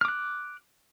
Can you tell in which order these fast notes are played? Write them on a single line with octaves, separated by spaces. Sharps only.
F6 D6 F#6